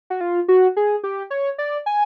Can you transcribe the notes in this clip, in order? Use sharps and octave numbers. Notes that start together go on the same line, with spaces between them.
F#4
F4
F#4
G#4
G4
C#5
D5
G#5